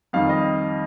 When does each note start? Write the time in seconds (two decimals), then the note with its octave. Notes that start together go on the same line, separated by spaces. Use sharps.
0.13 F2 D#3 G3 F5
0.29 D#5